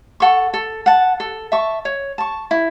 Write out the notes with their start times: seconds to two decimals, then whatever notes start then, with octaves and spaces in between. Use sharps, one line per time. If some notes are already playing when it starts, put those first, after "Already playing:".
0.20 A4 F#5 C#6
0.54 A4
0.86 F#5 A5
1.20 A4
1.52 E5 A5 C#6
1.85 C#5
2.18 A5 C#6
2.51 E4